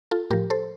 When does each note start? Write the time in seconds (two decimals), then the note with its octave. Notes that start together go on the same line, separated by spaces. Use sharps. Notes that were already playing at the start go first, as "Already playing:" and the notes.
0.11 F4 A4
0.30 A2 F3 G4 A#4
0.50 A4 C5